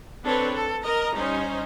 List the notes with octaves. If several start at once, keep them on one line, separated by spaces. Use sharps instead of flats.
C4 D4 A4 B4 C#5
A4
A#4 D#5 A#5
G3 C#4 D#4 C5